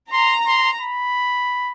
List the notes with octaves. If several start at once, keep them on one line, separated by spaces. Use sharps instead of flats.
A#5 C6
C6
B5